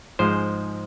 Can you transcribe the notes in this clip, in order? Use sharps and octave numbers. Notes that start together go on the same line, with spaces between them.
G#2 F3 G#3 C5